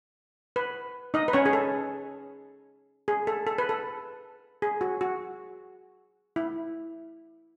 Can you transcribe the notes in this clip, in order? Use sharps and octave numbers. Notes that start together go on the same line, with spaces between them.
B4
D#4 D#5
B4
C#4 C#5
G#4
A4
G#4
A4
A4
B4
A4
G#4
F#4
F#4
E4